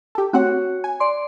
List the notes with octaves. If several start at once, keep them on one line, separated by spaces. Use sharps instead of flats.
G4 A4
A3 C4 F#4 C#5 F#5
G#5
D5 C6